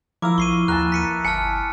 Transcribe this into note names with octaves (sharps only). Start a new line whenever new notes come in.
F3 E4 A#4 F5 D6 E6
A#1 C#6 C7 D#7
D#2 A#4 G#5 A5 F#6
B6 C#7 D#7
G1 G#5 A5 B5 F6 C#7